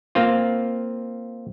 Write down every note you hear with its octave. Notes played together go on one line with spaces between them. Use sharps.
A#3 C4 F4